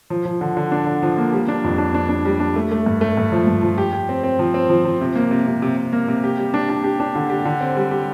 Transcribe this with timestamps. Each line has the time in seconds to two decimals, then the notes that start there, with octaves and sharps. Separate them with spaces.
0.10 F3
0.25 F3
0.41 D3
0.57 D3
0.72 D4
0.87 D3
1.03 F3
1.17 A#3
1.33 G3
1.48 D4
1.64 F2
1.78 D4
1.94 D4
2.09 D4
2.25 G3
2.40 D4
2.56 A3
2.71 A3
2.86 G2
3.01 A3
3.17 G2
3.32 F3
3.47 G2
3.62 F3
3.78 G4
3.93 G4
4.09 C4
4.23 C4
4.39 F3
4.54 C4
4.70 F3
4.85 F3
5.01 C3
5.15 A#3
5.31 C3
5.47 C3
5.62 C3
5.77 C3
5.93 A#3
6.08 C3
6.24 G4
6.38 G3
6.54 D4
6.69 D4
6.84 G4
7.00 D4
7.15 D3
7.30 G4
7.45 D3
7.61 C4
7.77 G3
7.91 G4